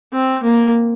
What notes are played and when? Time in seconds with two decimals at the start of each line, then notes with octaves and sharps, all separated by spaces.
0.13 C4
0.43 A#3